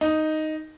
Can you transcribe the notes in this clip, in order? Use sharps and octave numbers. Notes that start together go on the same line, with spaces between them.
D#4